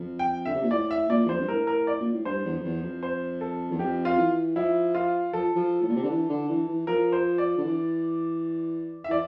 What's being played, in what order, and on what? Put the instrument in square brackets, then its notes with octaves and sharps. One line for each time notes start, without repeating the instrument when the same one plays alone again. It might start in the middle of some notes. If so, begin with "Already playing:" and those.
Already playing: [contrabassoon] F2
[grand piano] G5
[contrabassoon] D3 [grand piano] E5
[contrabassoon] C3
A#2
[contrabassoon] A2 [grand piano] D5
[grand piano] E5
[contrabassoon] A#2 [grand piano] D5
[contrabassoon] E2
[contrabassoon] F2 [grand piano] C5
[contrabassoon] G2
[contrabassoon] A2 [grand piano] A#4
[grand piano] A#4
D5
[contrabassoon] A#2
A2
[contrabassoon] G2 [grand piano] C5
[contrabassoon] E2
F2
E2
F2
[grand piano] C5
A4
[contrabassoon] E2
[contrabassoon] F2 [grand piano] G4
[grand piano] F4
[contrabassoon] E3
[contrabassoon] F3 [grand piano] E4
[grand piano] F4
[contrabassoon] F3 [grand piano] A4
[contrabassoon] F3
A2
A#2
C3
D3
E3
D3
E3
E3
[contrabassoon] F3 [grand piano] A#4
[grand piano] C5
D5
[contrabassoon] D3
E3
[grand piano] E5
[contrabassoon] E3 [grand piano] D5